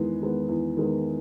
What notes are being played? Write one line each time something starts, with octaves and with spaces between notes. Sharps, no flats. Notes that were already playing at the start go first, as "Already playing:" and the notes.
Already playing: E2 D#3 G#3 B3
D#3 G#3 B3
E2
D#3 G#3 B3